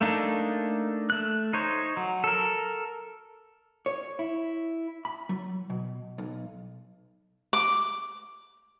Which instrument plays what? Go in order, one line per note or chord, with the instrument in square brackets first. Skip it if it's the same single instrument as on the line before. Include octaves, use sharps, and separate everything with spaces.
[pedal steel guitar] A3 A#3 D4 D#4
A3 F#6
D#4 C5 C#5
F#3
A4 A#4
[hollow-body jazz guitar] C#5
E4
B5
F#3
B2
B1
[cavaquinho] D6